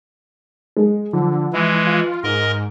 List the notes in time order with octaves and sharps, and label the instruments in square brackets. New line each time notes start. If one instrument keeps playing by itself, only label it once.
[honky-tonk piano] G#3
[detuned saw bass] D3 [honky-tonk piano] F3
[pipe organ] E3 G#3 [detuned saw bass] E4
[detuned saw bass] F4
[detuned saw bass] G#2 [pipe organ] A#4 D#5